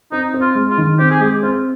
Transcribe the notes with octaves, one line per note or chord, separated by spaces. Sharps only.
C4 D#4
C4
F4
G#3
F4
D#3
C4 G4
G#4
G#3 G4
C4 F4